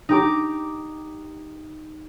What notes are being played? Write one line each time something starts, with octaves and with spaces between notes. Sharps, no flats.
D#4 G4 D6